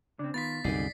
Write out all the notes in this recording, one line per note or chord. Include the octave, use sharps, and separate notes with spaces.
C#3 C4 D4
D#3 B3 F4 A6 B6
C2 F#2 D3 D#4 G#4 D5 C7